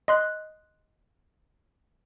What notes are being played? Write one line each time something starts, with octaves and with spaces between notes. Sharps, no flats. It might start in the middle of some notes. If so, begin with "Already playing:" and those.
D#5 C6 F#6